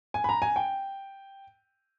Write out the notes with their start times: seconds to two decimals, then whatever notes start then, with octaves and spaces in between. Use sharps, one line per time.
0.14 G#5
0.24 B5
0.29 A#5
0.42 G#5
0.56 G5